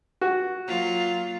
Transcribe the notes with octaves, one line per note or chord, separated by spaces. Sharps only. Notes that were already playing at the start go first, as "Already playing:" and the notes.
F#4
F#3 A#3 F4